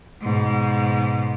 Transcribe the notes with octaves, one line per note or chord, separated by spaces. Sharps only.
G#2 B2